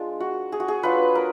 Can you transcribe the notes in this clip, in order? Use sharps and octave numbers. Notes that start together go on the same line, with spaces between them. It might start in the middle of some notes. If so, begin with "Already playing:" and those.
Already playing: G#3 D4 F4
F#4
G#4
F#4
G#4
F#3 D4 F4 B4
A#4